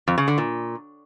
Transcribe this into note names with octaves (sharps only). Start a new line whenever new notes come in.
F2
C#3
D3
A#2